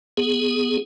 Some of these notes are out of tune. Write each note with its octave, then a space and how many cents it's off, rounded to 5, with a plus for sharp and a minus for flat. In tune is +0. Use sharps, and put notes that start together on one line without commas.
B3 +0 G#4 +0